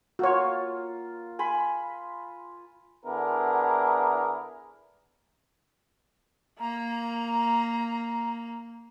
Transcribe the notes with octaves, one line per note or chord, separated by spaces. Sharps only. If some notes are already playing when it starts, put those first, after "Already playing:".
A#3 F4 F#4 C#5
G#5 B5 C6
D3 B3 D4 E4 G#4 A#4
A#3 A#5